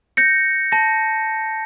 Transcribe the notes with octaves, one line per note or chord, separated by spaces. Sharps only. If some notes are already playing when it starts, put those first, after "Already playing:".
G6 A#6 C#7
A5 A#6